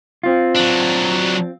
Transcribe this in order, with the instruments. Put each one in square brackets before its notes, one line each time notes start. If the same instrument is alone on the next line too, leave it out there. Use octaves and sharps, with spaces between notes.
[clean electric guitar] C4 F4
[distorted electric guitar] F#3 D4